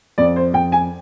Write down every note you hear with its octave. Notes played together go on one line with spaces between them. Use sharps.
F2 D5
C5
F2 G5
G#5